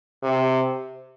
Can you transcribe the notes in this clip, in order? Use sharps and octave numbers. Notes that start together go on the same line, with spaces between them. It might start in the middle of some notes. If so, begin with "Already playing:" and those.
C3